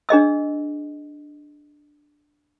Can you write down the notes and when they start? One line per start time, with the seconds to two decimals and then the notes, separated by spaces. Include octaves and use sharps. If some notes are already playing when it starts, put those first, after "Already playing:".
0.09 D4 G#4 D#5 E6